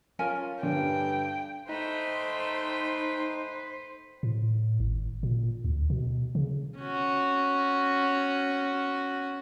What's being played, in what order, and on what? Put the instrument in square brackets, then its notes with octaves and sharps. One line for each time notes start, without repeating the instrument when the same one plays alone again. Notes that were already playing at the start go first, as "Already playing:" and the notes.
[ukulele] C#4 A#4 G#5 [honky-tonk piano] F4
[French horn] G2 [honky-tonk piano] D3 [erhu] G5
[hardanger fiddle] A3 G5 [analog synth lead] D#4 [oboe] B4 [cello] C5
[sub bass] A2
G#1
A#2
D2
B2
C#3
[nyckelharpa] C#4 F#4